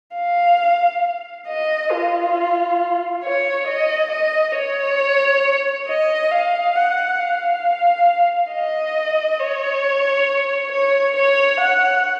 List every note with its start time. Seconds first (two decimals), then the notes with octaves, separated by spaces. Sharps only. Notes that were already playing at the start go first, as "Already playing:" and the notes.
0.15 F5
1.48 D#5
1.91 F4
3.24 C#5
3.68 D#5
4.12 D#5
4.56 C#5
5.88 D#5
6.31 F5
6.76 F#5
7.20 F5
8.52 D#5
9.40 C#5
10.72 C#5
11.16 C#5
11.60 F#5